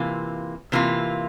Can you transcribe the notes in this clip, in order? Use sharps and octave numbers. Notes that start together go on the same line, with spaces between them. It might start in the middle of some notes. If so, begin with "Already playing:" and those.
Already playing: C3 E3 A#3 F4
C3 E3 A#3 F4